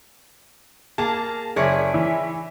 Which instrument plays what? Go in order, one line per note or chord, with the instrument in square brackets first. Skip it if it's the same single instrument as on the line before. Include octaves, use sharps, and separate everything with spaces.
[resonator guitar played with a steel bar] A#3 G#4 [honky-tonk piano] A5
[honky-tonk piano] F#1 [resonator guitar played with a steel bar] G#4 C#5 D5 [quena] E5
[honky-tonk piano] E3